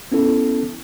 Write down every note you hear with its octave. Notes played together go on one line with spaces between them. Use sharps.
B3 C#4 E4 A4